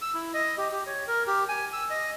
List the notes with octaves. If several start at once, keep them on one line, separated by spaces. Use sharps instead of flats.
E6
E4
D#5
G4
G4
C#5
A#4
G4
G#5
E6
D#5